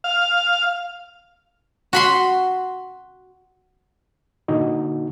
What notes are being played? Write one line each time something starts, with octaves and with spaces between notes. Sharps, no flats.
F5
F#4 B5 C6
A#2 D3 D#4 F#4